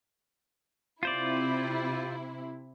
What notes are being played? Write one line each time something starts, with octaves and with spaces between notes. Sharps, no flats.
C3 E4 F4 C5 D5